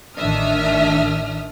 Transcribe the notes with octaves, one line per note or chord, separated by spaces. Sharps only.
A1 D#3 D4 E5 D#6 F6